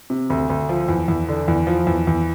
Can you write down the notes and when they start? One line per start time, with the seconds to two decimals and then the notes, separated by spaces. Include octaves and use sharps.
0.10 C3
0.30 D2
0.50 D2
0.69 F3
0.88 E2
1.08 E2
1.29 D3
1.48 E2
1.67 F3
1.87 E2
2.07 E2